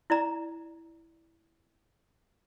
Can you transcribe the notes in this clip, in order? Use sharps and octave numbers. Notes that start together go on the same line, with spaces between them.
E4 D5 A#5